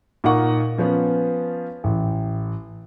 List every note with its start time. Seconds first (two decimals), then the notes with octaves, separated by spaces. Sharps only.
0.24 A#2 D#4 A#4 F#5 C#6
0.78 F3 B3 C#4
1.84 A1